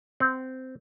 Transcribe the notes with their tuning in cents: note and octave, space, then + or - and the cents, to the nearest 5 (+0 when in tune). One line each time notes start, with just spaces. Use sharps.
C4 -15 F#5 +0